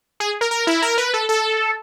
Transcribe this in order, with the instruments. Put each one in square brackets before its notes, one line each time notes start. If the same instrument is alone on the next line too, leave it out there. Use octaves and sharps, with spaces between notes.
[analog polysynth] G#4
A#4
A#4
E4
A#4
B4
A4
A4